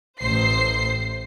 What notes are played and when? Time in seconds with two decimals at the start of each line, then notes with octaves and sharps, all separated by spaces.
0.20 A1 C5 C7